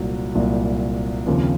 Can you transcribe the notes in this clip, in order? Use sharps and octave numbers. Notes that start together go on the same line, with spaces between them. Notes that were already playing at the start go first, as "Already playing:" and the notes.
Already playing: C2 A#2 F#3
C2 A#2 F#3
D#2 C#3 F3 C4